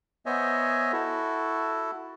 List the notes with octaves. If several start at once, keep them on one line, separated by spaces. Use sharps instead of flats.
B3 C5 C#5 D#5 E5 G#5
E4 F#4 A4